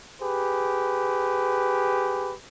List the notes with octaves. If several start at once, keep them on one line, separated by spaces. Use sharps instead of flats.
G4 G#4 B4